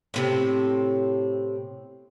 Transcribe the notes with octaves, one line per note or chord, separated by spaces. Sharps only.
A2 C3 C4